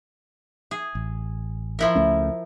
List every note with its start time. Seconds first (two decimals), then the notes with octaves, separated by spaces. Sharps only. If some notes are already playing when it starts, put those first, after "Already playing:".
0.71 G#4
0.95 A1
1.79 F3 E4 A#4
1.95 C#2 A3 C#4